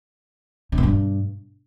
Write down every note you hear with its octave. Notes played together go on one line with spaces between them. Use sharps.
C#3
B2
G2